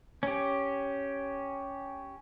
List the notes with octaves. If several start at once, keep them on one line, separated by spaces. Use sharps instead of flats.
C#4 G4